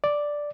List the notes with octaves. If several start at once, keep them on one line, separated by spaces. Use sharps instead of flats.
D5